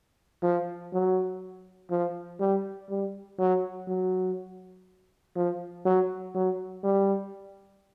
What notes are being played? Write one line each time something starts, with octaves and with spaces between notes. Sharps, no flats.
F3
F#3
F3
G3
G3
F#3
F#3
F3
F#3
F#3
G3